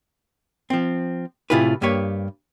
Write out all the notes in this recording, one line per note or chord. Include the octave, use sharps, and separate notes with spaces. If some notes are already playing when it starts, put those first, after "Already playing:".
F3 C4
A2 C3 E4 F4 G#4 B4
G2 A#3 G4 B4 C#5